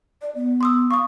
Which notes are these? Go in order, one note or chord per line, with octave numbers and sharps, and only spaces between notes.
D5
B3
C6 D#6 E6
F5 C#6 D#6